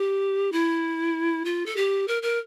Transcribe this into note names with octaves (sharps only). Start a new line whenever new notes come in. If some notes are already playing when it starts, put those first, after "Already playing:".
Already playing: G4
E4
F4
A4
G4
A#4
A#4